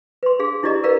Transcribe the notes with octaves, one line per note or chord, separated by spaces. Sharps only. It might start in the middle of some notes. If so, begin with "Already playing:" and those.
B4 C6
D4 G#4 F5
D4 E4 G4 D5 D#5 A#5
A#4 B4 D5 F5 A#5